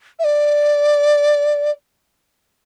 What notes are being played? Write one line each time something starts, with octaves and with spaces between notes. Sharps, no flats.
E5
D5